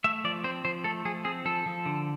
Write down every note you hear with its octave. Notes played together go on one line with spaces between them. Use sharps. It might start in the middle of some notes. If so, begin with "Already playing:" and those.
A3 E5
F3 D5
C4 C5
F3 C5
A3 A4
F3 G#4
C4 G#4
F3 A4
F3
D3